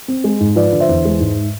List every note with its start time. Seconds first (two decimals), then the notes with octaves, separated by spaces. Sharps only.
0.08 C4
0.24 G#3
0.40 G#2
0.56 F3 B4 D5
0.72 D3
0.80 C5 E5
0.88 E2
1.05 G#3
1.20 G#2